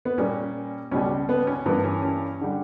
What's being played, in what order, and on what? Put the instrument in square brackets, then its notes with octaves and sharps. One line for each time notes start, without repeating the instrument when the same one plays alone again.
[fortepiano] B3
A#2 G3 A#3 C#4
C#2 B2 G3 C#4
B3
C#4
G2 E3 A#3 B3
C#4
C#4
D3 G3